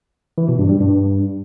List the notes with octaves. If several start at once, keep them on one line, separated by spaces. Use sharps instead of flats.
E3
B2
G2
G3
G2